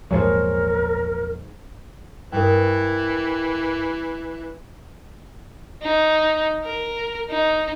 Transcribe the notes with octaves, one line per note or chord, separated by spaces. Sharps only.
A#1 E2 G#2 F#3 G#4 A#4 C5 C#5
G2 E3 A#4 G5
D#4
A#4
D#4